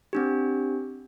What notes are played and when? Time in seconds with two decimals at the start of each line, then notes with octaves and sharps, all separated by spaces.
0.13 C4 D4 G4